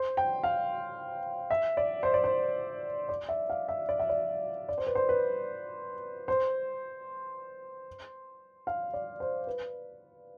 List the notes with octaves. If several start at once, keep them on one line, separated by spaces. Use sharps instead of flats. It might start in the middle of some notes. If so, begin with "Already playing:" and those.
Already playing: C5
G5
F5
E5
D5
C5
D5
C5
D5
E5
F5
E5
D5
E5
D5
D5
C5
B4
C5
B4
C5
F5
D5
C5
B4